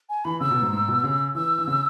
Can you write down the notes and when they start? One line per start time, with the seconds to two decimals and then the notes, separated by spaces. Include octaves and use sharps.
0.09 G#5
0.25 E3 B5
0.40 C#3 E6
0.51 B2
0.62 G#2
0.73 G#2
0.88 B2
1.04 C#3
1.35 E3 E6
1.59 E3
1.67 C#3